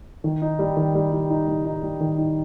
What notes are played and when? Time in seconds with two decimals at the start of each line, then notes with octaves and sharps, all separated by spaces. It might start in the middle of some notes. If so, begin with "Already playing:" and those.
0.24 D#3
0.42 D#4
0.59 G3
0.77 D#3
0.95 G3
1.12 G3
1.30 D#4
1.48 G3
1.65 D#4
1.82 G3
2.01 D#3
2.18 D#4